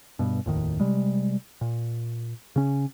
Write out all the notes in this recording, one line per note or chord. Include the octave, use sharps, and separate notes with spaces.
G2 B2
F1 D#2 A2 D#3
C3 G3 G#3
A#2
C#3 C#4